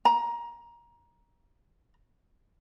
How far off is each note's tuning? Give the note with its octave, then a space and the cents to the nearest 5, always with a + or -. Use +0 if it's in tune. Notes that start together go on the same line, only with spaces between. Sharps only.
A#5 +20